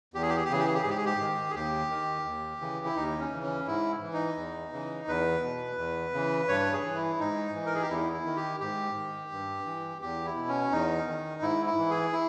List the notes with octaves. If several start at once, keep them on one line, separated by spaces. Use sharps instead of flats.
E2 G4
G#4
G4
G#4
G4
C#3 E3 G#4
G4
G#4
G4
G#2 G#4
G4
G#4
G4
D#3
G#4
D#2 G4
D#3
D#2
C#3 E3
E4
D#2 D#4
C#4
C#3 E3
C#4
G#2 E4
E3
D#4
E2
C#3 E3
E2 B4
B2
E2
C#3 E3
G2 C#5
G#4
E3
E4
G#2 D#4
E3
A#4
G#4
G4
E2 E4
E4
D#3
G4
G#2 G4
D#3
G2
E3
E2 G4
E4
B2
C#4
E2 D#4
D#3
G#2 E4
E4
E3
G#4
E4